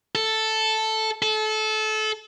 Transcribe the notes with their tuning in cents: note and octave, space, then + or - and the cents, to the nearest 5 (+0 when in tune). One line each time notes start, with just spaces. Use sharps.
A4 +0
A4 -25